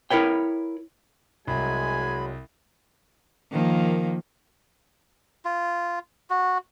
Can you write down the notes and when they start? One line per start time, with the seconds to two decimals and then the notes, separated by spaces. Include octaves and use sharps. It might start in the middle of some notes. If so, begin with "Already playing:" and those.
0.10 E4 A#4 B4 C#5 G5
1.47 C2 F#3 G#3 G#5 B5
3.52 D#3 F3 A#3
5.45 F4
6.30 F#4